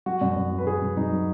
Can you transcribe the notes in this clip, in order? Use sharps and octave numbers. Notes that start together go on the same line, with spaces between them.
F#3 F#4
F#2
F#2
F#3
B4
F#3 G#4
F#2
F#2 D#4
F#3